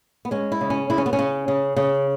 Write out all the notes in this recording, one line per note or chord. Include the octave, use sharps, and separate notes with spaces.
B3
G#3 C#4
E4
C#3
C#4
C#3 E4
C#4
B3
C#4
C#3
C#3
C#3